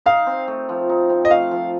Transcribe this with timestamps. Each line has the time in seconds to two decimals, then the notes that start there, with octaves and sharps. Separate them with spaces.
0.06 D#4 F5
0.27 C4
0.48 A3
0.69 F3
0.89 D#4
1.10 C4
1.25 D#5
1.31 A3 F5
1.51 F3